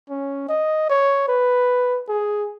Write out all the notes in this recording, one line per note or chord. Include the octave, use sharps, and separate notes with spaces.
C#4
D#5
C#5
B4
G#4